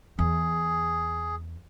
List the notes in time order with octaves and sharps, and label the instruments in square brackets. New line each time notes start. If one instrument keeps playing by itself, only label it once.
[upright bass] E2 [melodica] G#4